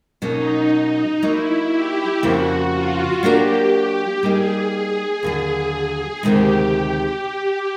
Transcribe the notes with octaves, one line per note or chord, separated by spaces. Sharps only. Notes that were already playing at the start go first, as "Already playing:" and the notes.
B2 F#3 A#3 C#4 D#4
F#3 A#3 D#4 E4
G4
F2 C#3 F3 A#3 F#4
F4
F#3 A#3 D4 F#4 G4 A#4
G4
G3 A#3 D#4 G#4
G#4
D#2 D3 F#3 G#4
G#4
D2 C3 D#3 G#3 G4